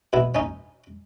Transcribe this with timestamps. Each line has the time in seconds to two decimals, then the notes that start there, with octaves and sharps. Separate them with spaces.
0.13 B2 E4
0.35 C#4 D#4